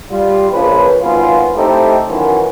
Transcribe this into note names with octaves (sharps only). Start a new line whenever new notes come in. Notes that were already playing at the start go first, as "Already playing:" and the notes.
G3 F4
A#1 C#3 F3 B4
G#1 C#2 B3 C#4 F4
A3 C4 D#4 E4 G4 A4
F#2 D#3 E3 F#3 C#4 F4